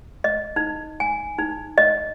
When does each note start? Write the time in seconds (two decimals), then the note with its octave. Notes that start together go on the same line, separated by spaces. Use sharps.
0.24 D#5
0.56 D#4
1.00 G#5
1.39 D#4
1.78 D#5